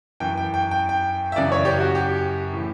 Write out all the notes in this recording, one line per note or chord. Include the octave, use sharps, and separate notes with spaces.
F#2 E3 G5
G5
G5
G5
G5
E5
F#2 C#3 E3 D5
C#5
G4
F#4
G4
A2 E3